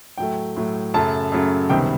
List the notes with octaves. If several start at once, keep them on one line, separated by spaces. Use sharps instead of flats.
A2 F#3 A3 G5
A2 F#3 A3
F#2 C#3 F#3 A3 A5
F#2 C#3 F#3 A3
C#2 C3 D#3 G3 B3 G5